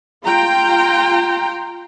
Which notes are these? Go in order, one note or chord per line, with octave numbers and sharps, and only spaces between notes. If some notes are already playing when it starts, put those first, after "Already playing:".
F4 G5 A#5 C6